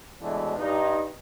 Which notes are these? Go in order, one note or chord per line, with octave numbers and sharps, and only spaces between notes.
B2 E3 F#3 G#3 A3 D4
G2 D#4